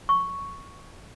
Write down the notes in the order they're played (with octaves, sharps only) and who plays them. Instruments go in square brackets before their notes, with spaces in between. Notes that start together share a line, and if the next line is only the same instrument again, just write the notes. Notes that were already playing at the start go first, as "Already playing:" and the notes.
[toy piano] C#6